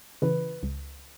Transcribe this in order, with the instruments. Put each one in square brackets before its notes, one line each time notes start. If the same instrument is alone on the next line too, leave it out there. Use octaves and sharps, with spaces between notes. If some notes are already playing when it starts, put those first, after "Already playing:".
[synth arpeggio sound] C#3 E3 [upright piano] B4
[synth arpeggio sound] C#2